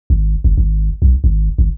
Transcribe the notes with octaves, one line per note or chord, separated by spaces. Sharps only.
G#1
G1
G#1
B1
G#1
G#1